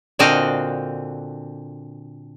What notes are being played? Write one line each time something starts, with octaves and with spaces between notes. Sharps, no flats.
A#2 D3 C4 F#4 D#5 F5